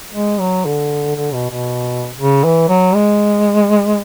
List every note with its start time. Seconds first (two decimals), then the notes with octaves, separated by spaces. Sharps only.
0.14 G#3
0.40 F#3
0.65 D3
1.16 D3
1.33 B2
1.50 B2
2.19 C#3
2.44 E3
2.69 F#3
2.94 G#3